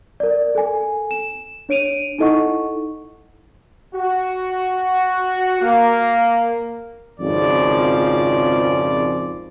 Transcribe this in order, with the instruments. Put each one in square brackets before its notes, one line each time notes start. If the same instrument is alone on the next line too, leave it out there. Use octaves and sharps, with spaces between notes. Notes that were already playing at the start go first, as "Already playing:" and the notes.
[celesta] A#4 D5
A4 G#5
E7
D4 C#5 D7 D#7 F7
D#4 E4 A4 D#5 F#5 C#6
[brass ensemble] F#4
A#3
G#1 F2 C#3 F3 D5